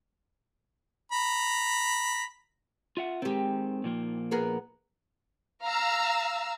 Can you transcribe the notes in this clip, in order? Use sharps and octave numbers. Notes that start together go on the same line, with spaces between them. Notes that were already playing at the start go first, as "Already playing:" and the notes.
A#5 B5
F4 E5 F#5
D#3 G#3 C4 G4
A#2 F3 A#3
B3 G#4 A#4
F5 A#5 E6